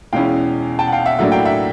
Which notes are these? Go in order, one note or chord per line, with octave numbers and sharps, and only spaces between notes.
E2 B2 G#3 C#4 E4 F5 G5
G5 A5
F#5
F5 G5
E5 F#5
A2 F#3 A#3 D4 E5 F#5
F5 G5
E5 F#5